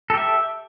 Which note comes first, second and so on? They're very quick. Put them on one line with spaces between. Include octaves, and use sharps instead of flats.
A4 G4 E5